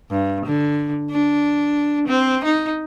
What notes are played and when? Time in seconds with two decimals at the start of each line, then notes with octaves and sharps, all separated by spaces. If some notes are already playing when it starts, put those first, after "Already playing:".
0.10 G2
0.46 D3
1.11 D4
2.08 C4
2.44 D#4